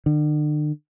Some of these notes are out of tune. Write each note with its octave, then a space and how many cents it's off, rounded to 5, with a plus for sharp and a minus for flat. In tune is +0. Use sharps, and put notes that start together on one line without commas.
D3 +40